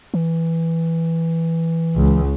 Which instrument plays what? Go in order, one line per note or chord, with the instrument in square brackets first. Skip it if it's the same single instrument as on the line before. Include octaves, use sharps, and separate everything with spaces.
[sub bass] E3
[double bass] C#2